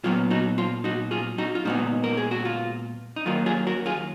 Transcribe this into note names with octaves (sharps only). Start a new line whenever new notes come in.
A#2 F#3 B3 F4
D#4 F#4
F4
D#4 F#4
F4 G#4
D#4 F#4
F4
A#2 G#3 B3 D#4 F#4
A#4
G#4
F#4
F4
D#4
D#2 D#3 F#3 A#3 F4
F4 G#4
F#4 A#4
F4 G#4